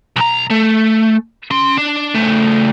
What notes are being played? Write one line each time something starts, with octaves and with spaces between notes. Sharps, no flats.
B1 A#5
A3
C#4 C6
D4
C#3 A3